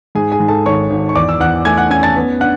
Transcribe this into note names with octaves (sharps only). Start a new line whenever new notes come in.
G#2 G#4 G#5
G#4 G#5
G#2
A4 A5
G#1 C#5 C#6
G#1
C#6
E2 D5 D6
E6
E2 F#5 F#6
A3 G#5 G#6
F#5 F#6
C#4 G#5 G#6
A5 A6
B3
D4 F#5 F#6